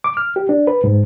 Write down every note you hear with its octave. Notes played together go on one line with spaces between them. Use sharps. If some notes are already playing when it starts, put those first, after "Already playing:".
D6
F6
G4
D4
B4
G#2